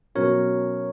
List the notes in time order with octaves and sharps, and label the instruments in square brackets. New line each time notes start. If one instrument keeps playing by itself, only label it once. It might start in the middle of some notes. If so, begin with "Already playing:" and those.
[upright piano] B2 F#3 C#4 [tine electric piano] A#4 C#5